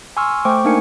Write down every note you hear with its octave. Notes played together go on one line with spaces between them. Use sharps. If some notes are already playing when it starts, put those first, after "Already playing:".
G#5 C6 C#6 E6 F6
A3 C5 G5 C#6 D6
A#3 D4 D#4 A#4 G#5 C#7